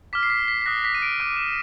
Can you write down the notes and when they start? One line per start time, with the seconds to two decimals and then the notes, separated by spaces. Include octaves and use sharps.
0.13 D6 F6 B6
0.23 C7
0.30 B6
0.48 B6
0.62 B6
0.66 D#6 F#6 A#6
0.85 B6
0.95 D#7
1.02 D7
1.20 D6 F#6 D#7
1.37 E7